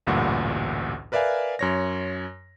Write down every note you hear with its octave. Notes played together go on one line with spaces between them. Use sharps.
A1 D2 G2 A#2 F#5
A#4 B4 D5 E5 F5 G#5
F#2 C#5 A#6